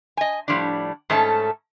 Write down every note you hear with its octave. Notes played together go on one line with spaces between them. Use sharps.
D#5 G#5
A2 F3 G3 D4
G#2 A3 C#4 A4 A5